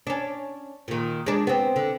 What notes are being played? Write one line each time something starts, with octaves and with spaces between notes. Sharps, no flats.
C#4 D4
A#2 D#3
G#3 D4
B3 C4
D3